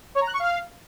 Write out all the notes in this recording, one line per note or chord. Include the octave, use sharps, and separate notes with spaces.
C#5
A#5
F#6
C#6
F5